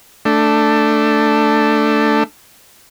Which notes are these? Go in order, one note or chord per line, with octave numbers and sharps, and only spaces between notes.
A3 D4